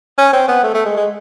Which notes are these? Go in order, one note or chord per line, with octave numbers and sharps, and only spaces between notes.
C#4
C4
B3
A3
A3
G#3
G#3